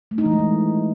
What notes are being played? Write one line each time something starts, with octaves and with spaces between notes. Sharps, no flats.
A3
D#4
E3
G#3
E3